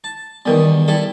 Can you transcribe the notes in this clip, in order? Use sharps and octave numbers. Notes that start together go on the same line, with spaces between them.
A5
E2 D#3 G3 B3 A#4 B4
G3 E4 A4